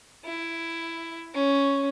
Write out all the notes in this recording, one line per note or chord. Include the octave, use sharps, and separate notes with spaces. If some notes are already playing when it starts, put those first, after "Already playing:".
E4
C#4